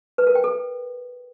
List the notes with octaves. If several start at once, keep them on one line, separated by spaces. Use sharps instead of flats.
B4
A#4
G5
A4